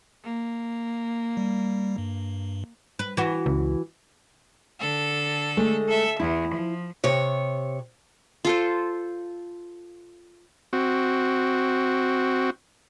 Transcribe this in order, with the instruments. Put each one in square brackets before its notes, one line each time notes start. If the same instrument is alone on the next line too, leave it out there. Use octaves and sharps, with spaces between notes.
[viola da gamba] A#3
[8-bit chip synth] G3
G2
[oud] B4
E3 F#4
[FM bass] C#2
[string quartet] D3 A4
[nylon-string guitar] G#3 A3
[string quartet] A4 E5
[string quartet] E2 [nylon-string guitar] E4
[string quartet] F3
[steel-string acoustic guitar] C3 C#5
[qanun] F4 A4 C5
[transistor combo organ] C4 F#4